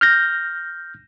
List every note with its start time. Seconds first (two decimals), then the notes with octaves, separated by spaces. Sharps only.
0.01 F6 G6 A#6